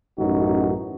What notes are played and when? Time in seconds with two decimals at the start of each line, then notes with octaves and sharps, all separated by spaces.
0.19 A1 F#2 D#4 F#4